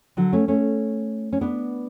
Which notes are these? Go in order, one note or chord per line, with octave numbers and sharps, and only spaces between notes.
D3 F#3
A3 C#4
A3 C#4
C#4
B3 D4